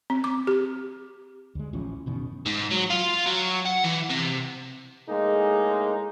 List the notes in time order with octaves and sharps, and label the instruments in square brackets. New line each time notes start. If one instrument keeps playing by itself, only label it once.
[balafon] C4
D6
G4
[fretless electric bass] D2 G#3
A1 E3 F3 C#4
F#1 B2 D#3 C#4
[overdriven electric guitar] G#2
F#3
F4
F#3
F#5
E3
C3
[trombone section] A2 G#3 A#3 D#4 G#4